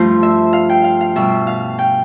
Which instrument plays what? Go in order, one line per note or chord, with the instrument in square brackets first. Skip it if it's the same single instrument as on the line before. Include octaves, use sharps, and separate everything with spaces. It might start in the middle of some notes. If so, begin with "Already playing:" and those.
Already playing: [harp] G2 F3 A3 C5
E5
F5
G5
F5
F5
B2 G3 E5
F5
G5